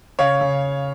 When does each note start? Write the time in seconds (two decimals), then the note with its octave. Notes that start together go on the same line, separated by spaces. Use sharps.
0.19 C#3 C#5 F5
0.41 C#3